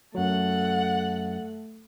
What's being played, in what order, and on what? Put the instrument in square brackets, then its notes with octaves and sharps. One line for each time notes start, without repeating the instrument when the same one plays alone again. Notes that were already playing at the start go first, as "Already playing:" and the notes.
[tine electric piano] F#2 F#3 [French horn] A3 [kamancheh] A4 F#5